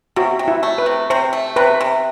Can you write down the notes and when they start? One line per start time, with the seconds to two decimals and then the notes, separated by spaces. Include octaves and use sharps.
0.16 C3 F#4
0.39 C3
0.48 E4
0.63 A3
0.78 B4
0.86 C3
1.10 C3 C5
1.33 A3
1.56 C3 B4
1.81 C3